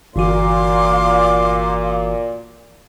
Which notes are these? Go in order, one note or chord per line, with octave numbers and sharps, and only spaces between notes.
G1 A#2 E3 F#4 F5 C6 D6